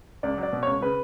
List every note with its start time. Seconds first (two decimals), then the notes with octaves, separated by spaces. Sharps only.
0.23 C#2 D5
0.38 F#3
0.43 D5
0.53 B2
0.63 C#2 C#5
0.81 C#3 B4